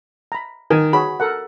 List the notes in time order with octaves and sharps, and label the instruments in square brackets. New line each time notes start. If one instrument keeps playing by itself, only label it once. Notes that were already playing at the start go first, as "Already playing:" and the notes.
[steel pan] A#5 B5
[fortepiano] D#3 [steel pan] G#5
[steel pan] F#4 G#4 C#5 [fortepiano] B5
[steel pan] A4 A#4 F#5